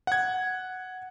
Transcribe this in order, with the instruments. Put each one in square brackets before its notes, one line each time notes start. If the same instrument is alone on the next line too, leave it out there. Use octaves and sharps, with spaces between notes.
[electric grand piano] F#5 G#6